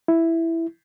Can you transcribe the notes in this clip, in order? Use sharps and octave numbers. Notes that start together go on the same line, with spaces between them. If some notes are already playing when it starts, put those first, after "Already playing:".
E4